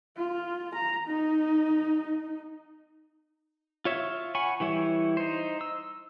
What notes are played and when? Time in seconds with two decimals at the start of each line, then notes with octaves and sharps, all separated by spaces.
0.17 F4
0.75 A#5
1.08 D#4
3.85 F4 C#5 E5
4.35 F#5 G#5 B5 C#6
4.60 E3 G3 E4 C#5
5.17 D#4 C5
5.61 E6